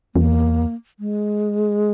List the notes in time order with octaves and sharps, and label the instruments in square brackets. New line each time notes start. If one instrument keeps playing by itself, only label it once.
[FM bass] E2 [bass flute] A#3
[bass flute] G#3